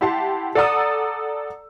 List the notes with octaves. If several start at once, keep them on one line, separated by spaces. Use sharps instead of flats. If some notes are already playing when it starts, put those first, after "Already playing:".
E4 G4 F#5 A5 C6
A4 D5 F#5 A#5 D#6 E6